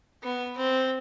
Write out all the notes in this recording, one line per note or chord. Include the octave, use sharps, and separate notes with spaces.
B3
C4